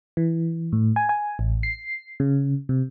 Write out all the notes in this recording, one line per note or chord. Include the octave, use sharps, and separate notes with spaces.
E3
A2
G#5
G#5
A1
C7
C#3
C3